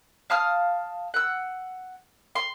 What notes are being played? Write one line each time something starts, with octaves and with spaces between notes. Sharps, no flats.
F5 A5 D#6 F6
F#5 E6
C6